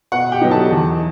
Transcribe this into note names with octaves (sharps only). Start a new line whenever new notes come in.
B2 F#5
G4 G5
F#3 B3 D#4
A4 A5
E2